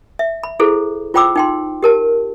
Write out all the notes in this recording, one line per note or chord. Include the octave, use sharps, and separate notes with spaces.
E5
B5
E4 G#4 A4 C5
F4 C5 G5 B5 D6 E6
D#4 G5 C6
G4 A#4 A5